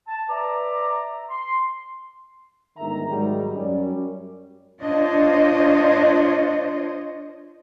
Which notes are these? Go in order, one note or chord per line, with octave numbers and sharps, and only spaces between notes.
A5
B4 D5 E5 A#5 D6
C6
G1 G#2 D#3 E5 A#5
G#2 D#3 F#3 G3
F#2 G3 C#4
D4 F4 C5 C#5 D#5